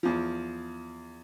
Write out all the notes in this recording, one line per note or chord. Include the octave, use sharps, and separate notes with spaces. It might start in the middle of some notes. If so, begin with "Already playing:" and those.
E2 F3